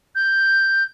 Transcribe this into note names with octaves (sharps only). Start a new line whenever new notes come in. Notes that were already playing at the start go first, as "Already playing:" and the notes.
G6